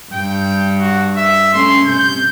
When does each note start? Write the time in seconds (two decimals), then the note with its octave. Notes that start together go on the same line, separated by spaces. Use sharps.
0.13 G2 G5
0.79 F#4
1.17 E5
1.54 A3 C#4 C6
1.86 C3 G6